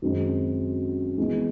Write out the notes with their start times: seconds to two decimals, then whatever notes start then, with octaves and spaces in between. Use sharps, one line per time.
0.02 F#2 D#3 G#3 C4
1.18 E3 G#3 B3